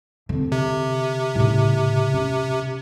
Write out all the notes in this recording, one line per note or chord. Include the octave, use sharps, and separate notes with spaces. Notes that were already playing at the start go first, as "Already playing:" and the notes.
D3 C4
C3
A2 C#3
C#4